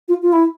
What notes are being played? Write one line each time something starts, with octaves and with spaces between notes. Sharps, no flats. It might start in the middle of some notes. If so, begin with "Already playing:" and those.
F4
F4
E4